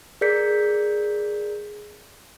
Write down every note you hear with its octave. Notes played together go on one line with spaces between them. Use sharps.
G#4 A#4 D5 G6 B6 C#7